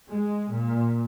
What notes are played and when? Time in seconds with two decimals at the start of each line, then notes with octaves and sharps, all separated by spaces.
0.11 G#3
0.52 A#2